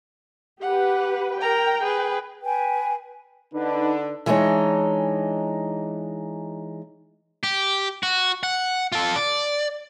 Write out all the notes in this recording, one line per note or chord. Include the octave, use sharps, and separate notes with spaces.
G4 B4 F#5
A#4 G5 A#5
G#4 B4
B4 G5 G#5
D3 D4 D#4 B4
E3 G#3 D4 D#4 C#5
G4
F#4
F#5
F4 A4
D5